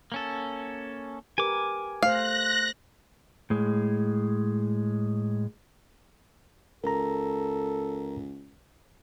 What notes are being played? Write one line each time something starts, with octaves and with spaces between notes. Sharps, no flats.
A#3 C#4 A4
G4 A#4 B4 G#5 D6
A3 C5 F5 F#6 A#6
A2 G#3
C#2 A4 A#4 A#5